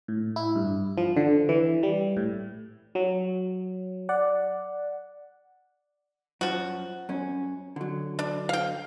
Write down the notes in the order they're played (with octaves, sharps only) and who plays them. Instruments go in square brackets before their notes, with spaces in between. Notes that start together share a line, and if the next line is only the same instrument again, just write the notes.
[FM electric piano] A2
E4
G2
F3
D3
E3
G3
A2
F#3
D5 F#5
[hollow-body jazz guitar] F#2 [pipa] F3 F#4
[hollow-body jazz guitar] F#2 C#4
D3 F#3
[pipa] D4
F5 G5